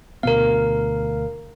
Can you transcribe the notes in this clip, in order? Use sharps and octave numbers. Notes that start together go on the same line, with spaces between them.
D2 B2 B3 A#4 F5